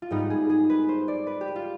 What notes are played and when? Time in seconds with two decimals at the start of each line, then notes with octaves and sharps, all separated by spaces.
0.02 F4
0.11 G#2 G3 B3 D#4
0.30 G#4
0.49 G#4
0.70 B4
0.89 C5
1.08 D5
1.27 B4
1.41 G4
1.56 F4